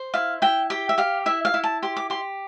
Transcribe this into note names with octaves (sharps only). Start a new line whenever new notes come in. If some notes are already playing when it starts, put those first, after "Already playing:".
Already playing: C5
E4 F5
E4 G5
G4 G5
E5
G4 F5
E4 E5
F5
E4
A5
G4 C6
D6
G4 C6